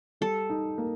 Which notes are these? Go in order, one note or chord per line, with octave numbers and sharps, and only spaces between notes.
G3 A4
D#4
A#3